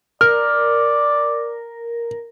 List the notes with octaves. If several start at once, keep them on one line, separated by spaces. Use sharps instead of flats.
A#4 D5 F6